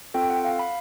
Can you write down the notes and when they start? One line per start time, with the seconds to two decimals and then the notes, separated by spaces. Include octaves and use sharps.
0.14 C4 F4 A4 G5
0.30 F#5
0.45 F5
0.59 B5